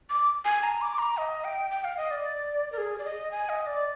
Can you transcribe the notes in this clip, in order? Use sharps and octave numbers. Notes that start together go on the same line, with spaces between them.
D6
G#5
A#5
D6
A#5
D#5
G5
G5
F5
D#5
D5
A#4
G#4
D5
D#5
G#5
D#5
D5